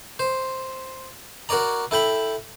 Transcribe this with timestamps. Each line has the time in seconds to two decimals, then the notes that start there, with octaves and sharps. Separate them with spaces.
0.19 C5
1.49 F#4 A#4 C#5 D5 A#5
1.91 E4 A4 G5 B5